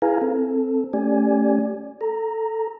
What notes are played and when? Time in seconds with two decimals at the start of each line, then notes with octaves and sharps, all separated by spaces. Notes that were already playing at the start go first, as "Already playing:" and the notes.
0.02 E4 G#4 B4 F5 G#5 A#5
0.21 C4 A4
0.93 A3 C#4 G4 D5 G#5
2.01 A4 A#5